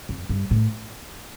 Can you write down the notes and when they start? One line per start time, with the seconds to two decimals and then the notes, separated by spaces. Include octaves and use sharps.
0.09 F2
0.29 G2
0.51 A2